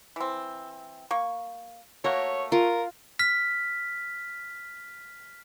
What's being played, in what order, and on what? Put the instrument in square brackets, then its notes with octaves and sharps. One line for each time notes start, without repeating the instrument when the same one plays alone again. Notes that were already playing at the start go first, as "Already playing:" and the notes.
[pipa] E3 C4
A#3 C#6
[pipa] A3 A#3 F#4 [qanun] A#4 [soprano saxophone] C#5
[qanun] F4 [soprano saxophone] A#4
[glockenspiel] F6 B6